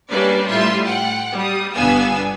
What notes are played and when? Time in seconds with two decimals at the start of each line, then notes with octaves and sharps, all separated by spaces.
0.10 G3 A#3 C#4 D4 B4 D5
0.48 A2 G3 F4 E5 C6
0.85 F#5 G5
1.34 G3 D#6
1.74 G1 B3 D4 F5 G#5 E6